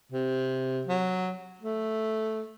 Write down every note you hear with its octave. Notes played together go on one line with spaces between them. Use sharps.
C3
F#3
A3